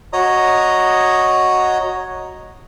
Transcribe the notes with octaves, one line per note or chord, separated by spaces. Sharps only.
F#4 C#5 D#5 A#5 D#6